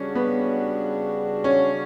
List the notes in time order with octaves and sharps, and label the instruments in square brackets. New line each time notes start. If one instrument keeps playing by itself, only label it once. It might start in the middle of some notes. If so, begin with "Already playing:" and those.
Already playing: [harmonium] C#3 G3 D4 F#4 [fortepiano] C#4
[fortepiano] B3
C#4